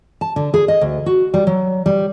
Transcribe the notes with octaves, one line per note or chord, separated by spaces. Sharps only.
A5
D3
G#4
D#5
D2
F#4
G3
F#3
G3